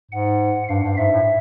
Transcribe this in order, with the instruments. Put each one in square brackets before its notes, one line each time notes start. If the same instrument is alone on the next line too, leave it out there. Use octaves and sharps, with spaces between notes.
[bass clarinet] G#2 [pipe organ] F#5
[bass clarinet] G2 [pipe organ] F5
[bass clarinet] G2
[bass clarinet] G#2 [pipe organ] E5
[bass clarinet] A2